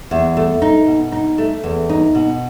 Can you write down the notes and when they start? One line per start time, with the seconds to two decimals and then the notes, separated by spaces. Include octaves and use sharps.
0.11 E2
0.37 A3
0.62 D#4
0.87 B2
1.12 D#4
1.38 A3
1.64 E2
1.89 D#4
2.15 B2